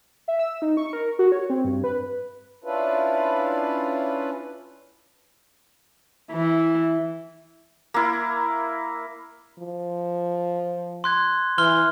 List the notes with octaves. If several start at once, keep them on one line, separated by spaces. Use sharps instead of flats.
E5
E6
D#4
C#6
A#4
F#4
C#5
C4
G2
B4
C#4 D4 E4 F4 B4
E3
A#3 E4
F3
C6 F#6 G#6
E3 C6 F6 G7